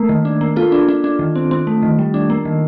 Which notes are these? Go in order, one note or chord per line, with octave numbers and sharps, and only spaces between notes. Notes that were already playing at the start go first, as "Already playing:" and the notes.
Already playing: A3 A#3
D#3
D4
A#3
A#3 F4 A4
D4
D4
D4
D#3
C4
C4
A3
D#3
G3
D4
A#3
D#3